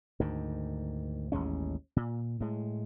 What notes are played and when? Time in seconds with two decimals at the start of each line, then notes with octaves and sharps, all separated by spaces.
0.20 D2 G#2 D#3
1.32 A1 D#2 G#3 C#4
1.96 A#2
2.40 A2 G#3